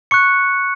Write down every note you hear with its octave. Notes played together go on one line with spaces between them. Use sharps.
C#6 F#6 C#7